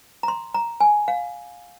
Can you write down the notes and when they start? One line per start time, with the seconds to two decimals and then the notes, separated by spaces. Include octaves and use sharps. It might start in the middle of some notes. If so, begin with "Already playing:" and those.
0.23 A#5
0.28 C6
0.54 A#5
0.80 G#5
1.08 F5